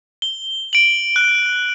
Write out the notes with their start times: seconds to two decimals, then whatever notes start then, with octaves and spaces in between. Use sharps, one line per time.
0.22 G7
0.73 D7 F#7
1.16 F#6